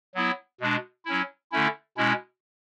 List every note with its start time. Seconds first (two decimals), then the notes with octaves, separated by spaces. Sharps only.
0.14 F#3 B3 E4
0.60 B2 G#3 D4
1.05 F#3 C#4 E4
1.52 D3 A3 C#4 E4
1.97 B2 G#3 C#4 E4